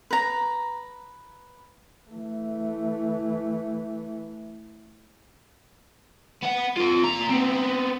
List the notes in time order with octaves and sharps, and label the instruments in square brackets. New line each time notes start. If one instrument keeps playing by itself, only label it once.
[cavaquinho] B4 A#5
[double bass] E3 A3
[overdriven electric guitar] B3 F#5
F4 A4
A#2 A#5
B3 C4